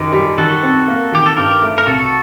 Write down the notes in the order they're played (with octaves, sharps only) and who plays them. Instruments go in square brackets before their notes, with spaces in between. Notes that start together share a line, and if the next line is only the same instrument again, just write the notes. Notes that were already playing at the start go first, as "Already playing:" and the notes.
Already playing: [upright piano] F#2 D#3 [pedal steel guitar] D#4 G4
[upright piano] G3
[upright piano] D#3 [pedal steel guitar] F#4 A4
[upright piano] C4
A#3
[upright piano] D#3 [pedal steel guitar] G4
[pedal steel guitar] A4
[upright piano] G2 [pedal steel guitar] G4 A#4
[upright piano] A3
[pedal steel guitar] A#4
[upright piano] C2 [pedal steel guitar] F#4 A4